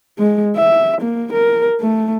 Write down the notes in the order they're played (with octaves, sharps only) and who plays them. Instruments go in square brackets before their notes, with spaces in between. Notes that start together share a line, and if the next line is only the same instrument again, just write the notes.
[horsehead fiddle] G#3
E5
A#3
A#4
A3